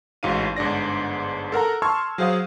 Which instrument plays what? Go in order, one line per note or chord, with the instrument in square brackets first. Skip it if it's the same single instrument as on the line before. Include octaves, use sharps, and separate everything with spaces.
[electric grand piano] A1 G#2 D#4 F#4 F5 D#7
G1 G#2 D4 D5 A#6
A4 A#4 F#5 A#5
A5 C6 C#6 E6 F6 G#6
F#3 G#4 C5 F5 F#5 D#6